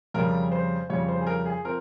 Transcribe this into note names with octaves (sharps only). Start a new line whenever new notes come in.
F2 C#3 G3 A#4
C5
F2 C#3 G3 C#5
C5
G#4
A#4
G#4
F3 C4 A#4